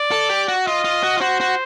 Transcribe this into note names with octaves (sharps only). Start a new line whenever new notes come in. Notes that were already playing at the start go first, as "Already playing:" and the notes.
Already playing: D5
A4
G4
F#4
F4 D#5
F4
F#4
F4
F#4 C5
F#4